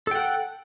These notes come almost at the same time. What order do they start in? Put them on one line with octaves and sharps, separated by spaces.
A4 G5 F#5